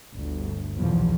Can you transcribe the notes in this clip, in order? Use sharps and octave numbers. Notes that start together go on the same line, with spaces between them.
G1 D2
B1 E2 A#2 F3